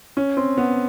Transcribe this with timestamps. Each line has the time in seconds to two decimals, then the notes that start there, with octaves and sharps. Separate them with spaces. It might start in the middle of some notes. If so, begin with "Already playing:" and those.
0.17 C#4
0.37 C4
0.57 B3